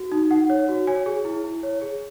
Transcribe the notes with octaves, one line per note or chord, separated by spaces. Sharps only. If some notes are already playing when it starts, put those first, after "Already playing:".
Already playing: F#4
D#4
D#4 F#5
C#5
F#4
C#5 G#5
G#4
E4
E4
C#5
G#4